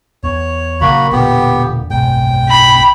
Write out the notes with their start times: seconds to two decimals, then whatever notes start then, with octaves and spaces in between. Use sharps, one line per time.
0.23 E2 C#5
0.81 A#1 C#3 F#3 A#3 F#4 B5
1.12 E1 A#2 D3 B3 G4
1.90 F#1 B1 G#2 G5
2.49 B5